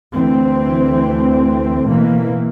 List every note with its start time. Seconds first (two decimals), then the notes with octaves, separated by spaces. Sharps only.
0.14 D2 E3 C4
1.86 B2 E3 A#3